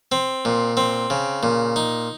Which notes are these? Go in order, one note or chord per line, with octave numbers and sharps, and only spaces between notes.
C4
A#2
C4
C#3
A#2
D#4